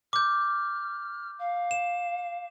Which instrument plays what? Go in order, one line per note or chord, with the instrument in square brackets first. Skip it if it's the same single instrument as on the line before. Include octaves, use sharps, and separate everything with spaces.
[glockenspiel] D6 G6 [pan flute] F6
[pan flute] F5
[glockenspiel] E7